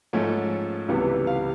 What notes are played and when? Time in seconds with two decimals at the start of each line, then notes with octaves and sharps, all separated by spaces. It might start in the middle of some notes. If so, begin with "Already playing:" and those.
0.13 G#2 F3 A3 C#4
0.89 C#2 C3 E3 G3 B3
1.27 F5